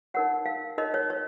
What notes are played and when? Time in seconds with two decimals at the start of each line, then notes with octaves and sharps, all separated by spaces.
0.14 D#4 A#4 C#5 F#5
0.46 F5
0.78 D#4 A#4 C#5 D#5
0.94 C#5
1.10 C#5